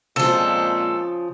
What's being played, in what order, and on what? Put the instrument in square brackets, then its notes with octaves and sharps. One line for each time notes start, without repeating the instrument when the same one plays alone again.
[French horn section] A#2 G#3 C4 [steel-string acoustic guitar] C#3 F3 [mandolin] A4